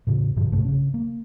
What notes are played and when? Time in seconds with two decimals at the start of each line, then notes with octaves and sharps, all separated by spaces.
0.07 A2 C#3
0.36 G2 A#2 D3 F3
0.52 A#1 G#2 C3 A3
0.65 C#3 C#4
0.94 A#3